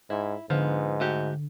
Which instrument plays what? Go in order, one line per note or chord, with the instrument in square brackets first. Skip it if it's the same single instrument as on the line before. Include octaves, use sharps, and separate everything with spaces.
[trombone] G#2 [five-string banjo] E4
[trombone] G#2 [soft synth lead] D3 [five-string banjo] F3 B3
[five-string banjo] A3 F#4 G4